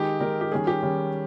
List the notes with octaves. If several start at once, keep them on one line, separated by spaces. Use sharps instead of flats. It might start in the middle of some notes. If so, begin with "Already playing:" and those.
Already playing: D#3 G#3 D#4 G4
D#3 G#3 D#4 A#4
G4
D#3 G3 C#4 G#4
G4
D#3 G3 C#4